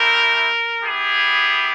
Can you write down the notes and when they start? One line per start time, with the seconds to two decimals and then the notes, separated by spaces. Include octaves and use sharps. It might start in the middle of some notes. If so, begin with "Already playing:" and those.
Already playing: A3 C4 E4 G4 A#4
0.82 B3 E4 G4 G#4